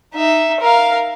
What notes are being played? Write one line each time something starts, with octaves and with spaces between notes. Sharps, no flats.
D#4 E5
A#4 F5